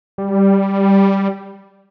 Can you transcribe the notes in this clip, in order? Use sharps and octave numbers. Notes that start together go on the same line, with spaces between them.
G3